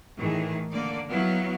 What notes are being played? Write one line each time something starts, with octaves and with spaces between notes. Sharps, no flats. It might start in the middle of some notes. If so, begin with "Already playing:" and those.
A2 D#3 E3 G#4
D3 A#3 D5
F#3 B3 E4 F5